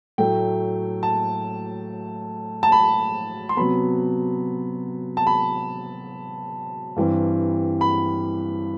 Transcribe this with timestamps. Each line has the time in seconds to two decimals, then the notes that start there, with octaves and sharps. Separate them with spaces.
0.18 A2 F#3 A3 G5
1.03 A5
2.63 A5
2.72 B5
3.49 C6
3.57 C3 F#3 B3 B5
5.17 A5
5.27 B5
6.96 G2 E3 G3 C4
7.81 B5